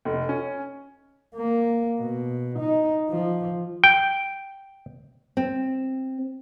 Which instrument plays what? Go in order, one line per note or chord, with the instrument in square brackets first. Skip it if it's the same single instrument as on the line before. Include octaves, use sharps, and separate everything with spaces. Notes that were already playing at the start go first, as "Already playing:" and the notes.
[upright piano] F1
C#4
[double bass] A#3
B2
D#4
F3
[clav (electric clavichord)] G5
[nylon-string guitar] C4